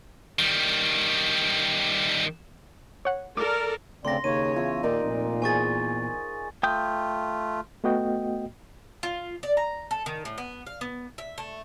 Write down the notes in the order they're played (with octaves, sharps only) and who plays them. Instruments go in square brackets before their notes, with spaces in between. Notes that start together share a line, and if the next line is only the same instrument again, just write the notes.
[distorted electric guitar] D#3 G3
[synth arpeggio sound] C#5 F#5
[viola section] A4 A#4 D5 [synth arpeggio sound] D6
[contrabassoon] D2 [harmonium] C#3 C4 D5 [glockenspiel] C6 A#6
[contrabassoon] D#2 [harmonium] C#3 C#5 [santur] C6 [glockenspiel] D#7
[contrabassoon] E2 [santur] F4 E5
[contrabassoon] D#2 [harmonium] A#2 [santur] D#4 A#4 D5
[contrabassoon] F1 [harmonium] A#2
[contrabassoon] E2 [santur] G#4 C5 [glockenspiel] G#5 C#6 A6
[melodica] A3 F4 [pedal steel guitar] G5 D#6 G6
[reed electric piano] A3 B3 F#4 D#5 G5
[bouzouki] F4
D5
A#5
A4
D#3
A2
B3
F5
B3
E5
A3